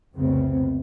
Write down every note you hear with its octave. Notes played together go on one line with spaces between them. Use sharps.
C2 F2 C#3 A3 B3 C4